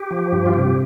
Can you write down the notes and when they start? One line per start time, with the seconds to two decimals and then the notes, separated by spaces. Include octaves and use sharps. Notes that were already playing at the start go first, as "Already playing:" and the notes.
Already playing: G4
0.11 F3
0.32 G2
0.46 F4
0.54 C3 G4